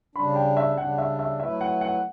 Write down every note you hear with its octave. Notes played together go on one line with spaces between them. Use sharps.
C#3 G3 D4 B5
G5
E5
C#3 G3 D4 F#5
E5
E5
F#3 A3 E4 B4 E5
F#5
F#5